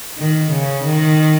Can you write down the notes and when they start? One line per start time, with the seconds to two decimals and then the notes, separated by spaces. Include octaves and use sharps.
0.18 D#3
0.52 C#3
0.85 D#3